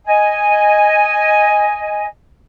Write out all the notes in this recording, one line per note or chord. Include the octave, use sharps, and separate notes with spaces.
D#5 G#5